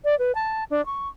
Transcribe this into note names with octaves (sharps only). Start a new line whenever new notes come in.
D5
B4
A5
D4
C#6